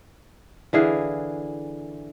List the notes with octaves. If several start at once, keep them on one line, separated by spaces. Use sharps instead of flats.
D3 E3 G#4 F5